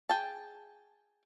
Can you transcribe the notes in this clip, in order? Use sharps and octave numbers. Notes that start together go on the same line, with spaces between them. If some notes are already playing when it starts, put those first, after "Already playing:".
G#4 G5 A5